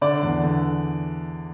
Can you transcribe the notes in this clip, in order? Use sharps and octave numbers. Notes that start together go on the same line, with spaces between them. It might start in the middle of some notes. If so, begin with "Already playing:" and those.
D3 D5
E2
D3